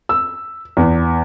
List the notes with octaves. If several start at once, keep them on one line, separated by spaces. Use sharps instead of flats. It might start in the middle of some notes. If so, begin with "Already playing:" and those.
E6
E2